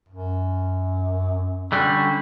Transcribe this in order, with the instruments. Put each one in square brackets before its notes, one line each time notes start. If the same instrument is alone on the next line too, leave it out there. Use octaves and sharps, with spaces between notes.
[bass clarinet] F#2
[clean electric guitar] D3 G3 F#4 [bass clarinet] C#4